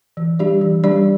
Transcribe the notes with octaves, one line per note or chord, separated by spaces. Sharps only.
E3
G3 D4 G4 D5
E3
G3 D4 G4 D5